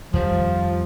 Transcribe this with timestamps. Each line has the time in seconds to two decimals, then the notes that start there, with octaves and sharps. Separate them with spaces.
0.13 F2 D#3 F3 G3